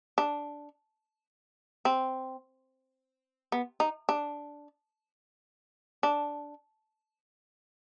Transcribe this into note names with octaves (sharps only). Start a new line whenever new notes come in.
D4
C4
B3
D#4
D4
D4